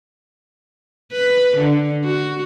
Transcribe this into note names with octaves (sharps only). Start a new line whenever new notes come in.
B4
D3
F#4